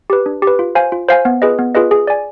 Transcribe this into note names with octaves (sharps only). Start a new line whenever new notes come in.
G4 B4
D4
G4
B4
F4
C5 F5 G#5
F4
C5 F5 G#5
B3
F4 G#4 B4 D#5
B3
F4 G#4 B4 D#5
G#4
D5 G#5